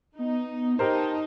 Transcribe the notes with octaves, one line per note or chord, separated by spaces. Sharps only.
B3 D#4
D#4 G4 A#4 C5 A5